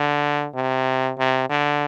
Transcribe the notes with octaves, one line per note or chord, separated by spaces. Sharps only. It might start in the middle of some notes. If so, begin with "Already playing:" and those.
Already playing: D3
C3
C3
D3